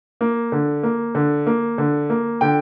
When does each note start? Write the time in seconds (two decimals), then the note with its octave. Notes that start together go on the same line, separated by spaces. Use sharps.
0.21 A#3
0.52 D3
0.83 A#3
1.15 D3
1.46 A#3
1.78 D3
2.10 A#3
2.41 D3 G5